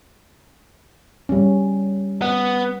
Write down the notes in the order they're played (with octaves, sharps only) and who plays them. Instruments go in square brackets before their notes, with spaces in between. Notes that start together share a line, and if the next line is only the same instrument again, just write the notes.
[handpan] G3 C#4
[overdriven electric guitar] B3